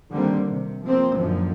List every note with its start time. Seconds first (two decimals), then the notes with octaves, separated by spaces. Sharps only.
0.10 D3 D#3 G3 A#3 C4
0.48 C3
0.83 F3 A#3 C4
1.15 F#2 A#2 D3 D#3 F3